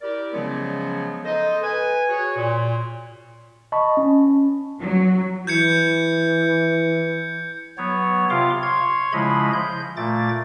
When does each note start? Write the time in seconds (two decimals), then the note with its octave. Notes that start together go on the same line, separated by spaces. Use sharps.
0.02 E4 G4 A#4 D5
0.33 C#3 F3 F#3 G#3 B3 C#4
1.25 D#4 A4 C5 D#5
1.63 B4 G#5
2.09 F#4 G#4 C#5
2.36 A#2
3.72 D#5 A5 B5 C#6
3.97 C#4
4.80 F#3
5.47 E3 G6 G#6 C#7
7.78 F#3 B3 C#5
8.30 C3 F4 F5 C6 D6
8.63 C#5 C6 G#6
9.13 C#3 F3 G#3 E4 D#5 B5
9.53 G6
9.97 A#2 A3 D6 A6